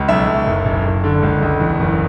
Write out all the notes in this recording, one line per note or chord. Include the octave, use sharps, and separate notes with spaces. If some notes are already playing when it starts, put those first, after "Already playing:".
Already playing: C#2
B1 E5
B1
F#1
F#1
F#1
D3
C#2
C#2
E2
F#1